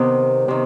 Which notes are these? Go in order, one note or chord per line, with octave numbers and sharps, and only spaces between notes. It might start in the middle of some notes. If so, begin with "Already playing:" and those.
Already playing: C3 D#3 B3
C3 D#3